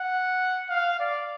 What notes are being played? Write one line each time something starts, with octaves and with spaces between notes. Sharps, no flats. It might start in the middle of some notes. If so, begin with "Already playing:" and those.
Already playing: F#5
F5
D5